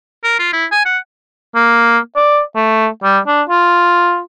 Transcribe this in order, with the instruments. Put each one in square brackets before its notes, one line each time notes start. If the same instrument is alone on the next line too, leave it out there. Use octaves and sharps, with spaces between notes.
[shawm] A#4
F4
E4
G#5
F#5
[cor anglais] A#3
D5
A3
G3
D4
F4